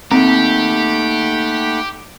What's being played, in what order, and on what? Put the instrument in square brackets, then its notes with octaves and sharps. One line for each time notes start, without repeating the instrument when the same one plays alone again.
[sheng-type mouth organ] A3 F#5 B5 [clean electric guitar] A#3 D#4 A#5 [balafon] C4 [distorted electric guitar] G4